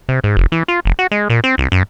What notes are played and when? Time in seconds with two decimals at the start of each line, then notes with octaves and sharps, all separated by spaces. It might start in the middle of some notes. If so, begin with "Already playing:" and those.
0.09 C3
0.24 G#2
0.37 F1
0.52 E3
0.68 F4
0.85 F1
0.99 F#4
1.12 G#3
1.30 A#2
1.44 C4
1.58 C2
1.72 F#2